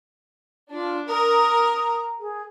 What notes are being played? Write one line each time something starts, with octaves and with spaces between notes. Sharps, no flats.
D4 F4
A#4 A#5 D#6
G#4